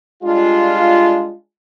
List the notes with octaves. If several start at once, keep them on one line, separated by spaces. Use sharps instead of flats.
G3 G#3 D4 F4